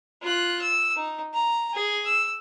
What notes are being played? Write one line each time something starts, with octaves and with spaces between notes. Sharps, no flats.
F4 F#6
E6
D#4
A#5
G#4
E6